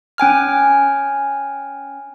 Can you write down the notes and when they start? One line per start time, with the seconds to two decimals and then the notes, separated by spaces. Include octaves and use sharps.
0.18 C#4 G5 G#5 F6